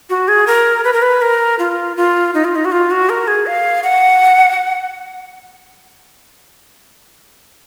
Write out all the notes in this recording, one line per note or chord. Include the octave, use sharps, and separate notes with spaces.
F#4
G#4
A#4
B4
A#4
B4
A#4
F4
F4
D#4
F4
D#4
F#4
F4
F#4
A#4
G#4
F5
F#5